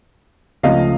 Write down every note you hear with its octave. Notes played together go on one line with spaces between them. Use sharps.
C#2 C#3 F3 A3 D#5 F5